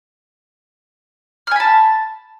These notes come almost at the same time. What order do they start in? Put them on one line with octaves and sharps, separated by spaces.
F6 G#5 B5 A5